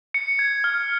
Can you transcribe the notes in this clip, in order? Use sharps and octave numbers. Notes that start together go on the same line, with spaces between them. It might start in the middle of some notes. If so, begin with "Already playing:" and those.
C#7
G#6
F6